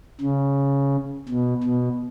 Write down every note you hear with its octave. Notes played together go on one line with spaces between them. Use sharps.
C#3
B2
B2